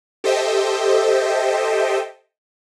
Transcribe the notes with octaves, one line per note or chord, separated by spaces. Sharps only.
G4 A4 C5 D#5 E5 G5